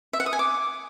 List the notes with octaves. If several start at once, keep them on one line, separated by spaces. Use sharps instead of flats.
E5
F#5
D#6
G#5
D6